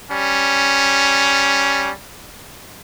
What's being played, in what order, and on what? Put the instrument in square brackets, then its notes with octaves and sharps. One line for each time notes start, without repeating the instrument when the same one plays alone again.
[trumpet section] G3 C#4